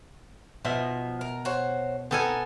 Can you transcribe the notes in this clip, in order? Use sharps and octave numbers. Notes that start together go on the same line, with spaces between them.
B2 F3 D#4 E5
A#4
F#4 C5 C#5
B3 C4 D#4 A4 A#4 G#5